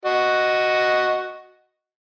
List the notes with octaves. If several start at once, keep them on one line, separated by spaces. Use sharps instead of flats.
F#4 D#5